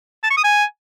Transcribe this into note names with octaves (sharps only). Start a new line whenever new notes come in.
A5
C#6
D#6
G#5